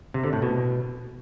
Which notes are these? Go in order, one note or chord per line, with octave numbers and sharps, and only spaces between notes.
C3
D3
A2
B2